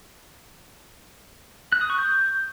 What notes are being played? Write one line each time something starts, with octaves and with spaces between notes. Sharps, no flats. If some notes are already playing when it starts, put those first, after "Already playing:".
F#6
D#6
C#6
G6